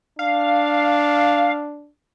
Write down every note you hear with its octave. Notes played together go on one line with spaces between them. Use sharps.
D4 F5